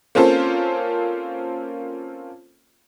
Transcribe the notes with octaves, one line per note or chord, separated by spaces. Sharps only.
A#3 C4 C#4 F4 A4 C5